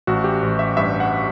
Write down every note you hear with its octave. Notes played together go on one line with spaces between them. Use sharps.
A1 F#4
G4
A1
E5
G2 E5
F#5